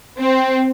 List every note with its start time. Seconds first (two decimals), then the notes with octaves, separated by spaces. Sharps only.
0.18 C4